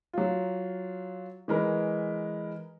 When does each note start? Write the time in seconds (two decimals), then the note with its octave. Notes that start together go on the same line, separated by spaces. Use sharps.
0.13 F#3 F4
1.48 E3 G#3 A#4 B4